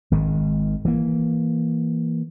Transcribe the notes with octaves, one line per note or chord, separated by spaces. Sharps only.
G#1 D#3 G#3
E3 A#3